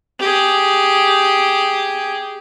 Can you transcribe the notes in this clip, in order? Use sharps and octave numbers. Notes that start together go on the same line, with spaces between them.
G4 G#4